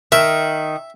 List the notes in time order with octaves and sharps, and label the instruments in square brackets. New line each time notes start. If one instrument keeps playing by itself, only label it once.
[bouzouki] D#3 [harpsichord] E5